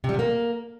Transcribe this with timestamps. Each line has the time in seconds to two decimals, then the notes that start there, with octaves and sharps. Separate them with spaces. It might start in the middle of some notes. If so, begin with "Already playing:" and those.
0.04 C3
0.09 G3
0.14 C3
0.19 A#3